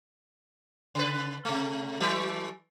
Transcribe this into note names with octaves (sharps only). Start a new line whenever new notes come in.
C#3 B4
C3 A3
E3 F#3 A3